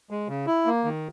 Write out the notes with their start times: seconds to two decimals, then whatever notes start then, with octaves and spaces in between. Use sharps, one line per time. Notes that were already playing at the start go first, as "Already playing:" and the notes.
0.11 G#3
0.28 C#3
0.47 E4
0.66 A#3
0.84 D#3